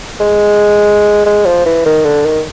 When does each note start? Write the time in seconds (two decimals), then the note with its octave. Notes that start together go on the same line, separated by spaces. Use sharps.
0.20 G#3
1.26 G#3
1.46 F3
1.66 E3
1.86 D#3
2.05 D3
2.25 D#3